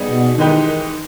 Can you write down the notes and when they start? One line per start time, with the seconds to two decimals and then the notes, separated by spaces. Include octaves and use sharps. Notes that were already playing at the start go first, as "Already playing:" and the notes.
Already playing: G3 B3 D#4 G#4
0.09 B2
0.38 D#3 E3 G#3 D#4 G4 B4